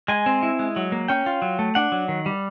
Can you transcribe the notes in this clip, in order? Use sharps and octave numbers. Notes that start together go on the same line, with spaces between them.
G#3 G#5
C4
E4
G#3
F#3
A#3
C#4 G5
F4
F#3
A3
D4 F#5
F#3
D#3
G3